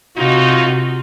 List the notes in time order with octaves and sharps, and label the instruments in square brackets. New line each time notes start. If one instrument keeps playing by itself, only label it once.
[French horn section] D#2 D#4 [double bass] C3 [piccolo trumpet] F4 [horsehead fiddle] F#4